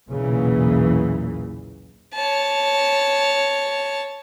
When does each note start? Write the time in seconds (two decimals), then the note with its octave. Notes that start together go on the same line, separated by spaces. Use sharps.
0.11 B1 E2 A#2 C#3 E3 A#3
2.14 C#5 A5